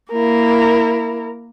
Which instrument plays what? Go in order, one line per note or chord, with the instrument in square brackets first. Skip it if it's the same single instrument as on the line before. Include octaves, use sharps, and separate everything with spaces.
[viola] A#3 [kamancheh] E4 A#4